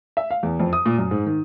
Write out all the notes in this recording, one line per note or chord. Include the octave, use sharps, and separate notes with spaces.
E5
F5
E2
F2
D#6
A#2
F#2
G#2
D#3